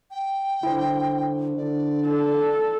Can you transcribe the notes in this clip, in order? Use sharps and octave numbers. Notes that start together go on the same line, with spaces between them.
G5
D3 E4 C5
D3 D5
A4